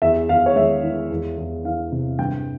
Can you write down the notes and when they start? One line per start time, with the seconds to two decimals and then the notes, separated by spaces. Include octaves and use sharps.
0.02 E2 E5
0.29 E2 F5
0.46 C#5
0.56 G#3 E5
0.83 E3
1.11 E2
1.38 E2
1.65 E3 F5
1.92 C3
2.19 G2 G5